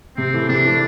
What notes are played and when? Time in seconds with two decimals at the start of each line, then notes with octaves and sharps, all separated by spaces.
0.17 C3 C4
0.33 E3 A3 E4
0.49 C3 D4
0.64 E3 A3 E4